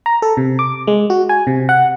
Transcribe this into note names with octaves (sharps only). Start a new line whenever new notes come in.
A#5
A4
C3
D6
G#3
F#4
G#5
C3
F#5